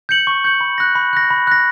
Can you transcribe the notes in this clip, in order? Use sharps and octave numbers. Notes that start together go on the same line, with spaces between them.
G6 C#7 F#7
C#6
G6 C#7 F#7
B5
F#6 A#6
B5
F#6 A#6
B5
F#6 A#6